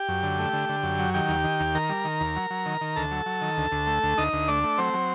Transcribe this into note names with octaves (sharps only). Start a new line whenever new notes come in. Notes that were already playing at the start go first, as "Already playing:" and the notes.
Already playing: G4 G5
F#2
D3
A3
D3
D3
F#2
F#3
D#3 G4 G5
D#2
D#3
D#2
D#3 A#4 A#5
G3
D#3
D#2
F#3
F#3
D#3
D#3
D2 A4 A5
F#3
F#3
D#3
D2
D2
A3
D2
D2 D#4 D#5
D2
A3 D4 D5
A3
F#3 C4 C5
F#3